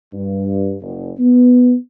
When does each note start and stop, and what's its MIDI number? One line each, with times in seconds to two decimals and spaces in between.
0.13 0.75 43
0.81 1.12 30
1.19 1.74 59